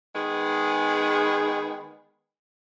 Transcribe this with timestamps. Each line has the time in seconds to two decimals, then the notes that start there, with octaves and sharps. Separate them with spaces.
0.15 D#3 G#3 B3 G#4